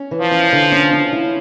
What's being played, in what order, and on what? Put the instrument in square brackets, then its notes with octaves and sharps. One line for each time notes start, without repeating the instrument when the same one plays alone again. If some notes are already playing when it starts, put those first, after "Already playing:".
Already playing: [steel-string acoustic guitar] C#4
E3
[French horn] F3
[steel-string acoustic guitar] C#4
D3
C#4
C#4
E4